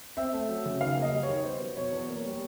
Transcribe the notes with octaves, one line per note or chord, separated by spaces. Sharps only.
C4 E5
A3
F#3
C#3
D#3 F5
A#3
D#5
G3
C#5
D#3
B3 C5
F#3
B2 C#5
E2
A#3
G3